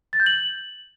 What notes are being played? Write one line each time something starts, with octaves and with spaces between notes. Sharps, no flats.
A6
G6
F#7